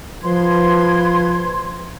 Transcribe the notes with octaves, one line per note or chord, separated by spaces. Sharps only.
F3 B4 C6 G#6